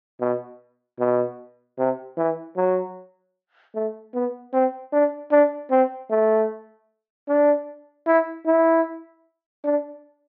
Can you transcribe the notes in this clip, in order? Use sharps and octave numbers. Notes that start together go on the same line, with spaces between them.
B2
B2
C3
E3
F#3
A3
B3
C4
D4
D4
C4
A3
D4
E4
E4
D4